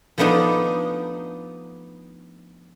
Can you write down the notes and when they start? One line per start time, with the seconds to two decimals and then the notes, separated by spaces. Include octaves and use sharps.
0.18 F3 A3 B3 D4 D#4